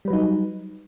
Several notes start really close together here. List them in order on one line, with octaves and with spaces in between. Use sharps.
G3 B4 F#3 D#4